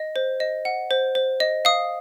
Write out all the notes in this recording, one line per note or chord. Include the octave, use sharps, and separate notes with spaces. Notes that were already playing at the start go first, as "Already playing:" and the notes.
Already playing: D#5
C5
D#5
F#5
C5
C5
D#5
F5 D#6